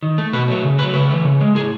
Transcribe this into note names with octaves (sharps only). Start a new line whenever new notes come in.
D#3
A3
B2 B4
F#3 A3
C#3
A3 B4
F#3
C#3 B4
E3 A3
C#3
G#3
A2 G#4